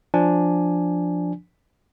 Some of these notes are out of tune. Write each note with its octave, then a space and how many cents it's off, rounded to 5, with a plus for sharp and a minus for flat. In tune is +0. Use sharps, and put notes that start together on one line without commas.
F3 +0 D4 +0 G#5 +0